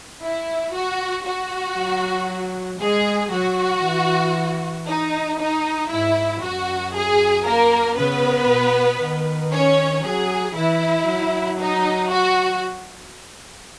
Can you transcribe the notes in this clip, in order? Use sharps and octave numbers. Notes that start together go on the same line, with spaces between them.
E4
F#4
F#4
F#3
G#3 G#4
F#3 F#4
E3
D#4
D#4
G#2 E4
F#2 F#4
G#4
A#3 A#4
C#3 B3 B4
B2
D#3
C#4 C#5
F#3 G#4
E3 E4
F#3
D#4
F#4